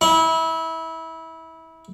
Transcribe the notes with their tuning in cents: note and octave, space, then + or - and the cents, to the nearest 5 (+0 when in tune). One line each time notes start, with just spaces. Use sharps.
E4 -25